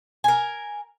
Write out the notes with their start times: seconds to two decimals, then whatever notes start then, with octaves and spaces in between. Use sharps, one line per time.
0.24 A#4 G#5